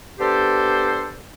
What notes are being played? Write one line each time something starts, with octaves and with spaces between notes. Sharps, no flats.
B3 D4 G4 A4 C5